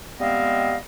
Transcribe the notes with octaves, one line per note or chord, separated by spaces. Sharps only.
G3 G#3 B3 C4 D#5 F5